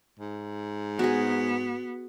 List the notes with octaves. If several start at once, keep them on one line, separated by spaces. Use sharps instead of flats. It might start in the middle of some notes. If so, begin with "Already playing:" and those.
G#2
B3 F#4 G#4